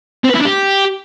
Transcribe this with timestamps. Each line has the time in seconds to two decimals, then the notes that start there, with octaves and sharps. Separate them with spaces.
0.24 C4
0.30 B4
0.35 E4
0.40 D4
0.46 G4